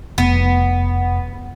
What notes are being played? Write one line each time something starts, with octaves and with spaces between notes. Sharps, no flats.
F1 B3